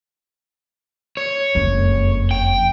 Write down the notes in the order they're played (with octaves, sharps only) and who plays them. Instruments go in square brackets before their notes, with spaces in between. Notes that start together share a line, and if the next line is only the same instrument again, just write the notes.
[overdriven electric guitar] C#5
[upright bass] F#1 F2
[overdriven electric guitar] G5